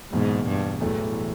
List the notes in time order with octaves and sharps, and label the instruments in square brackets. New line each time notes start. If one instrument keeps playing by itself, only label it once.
[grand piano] F#1 E2 B2 [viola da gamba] G#2
[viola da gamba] G2
[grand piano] B1 A2 E3 A3 [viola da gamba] E2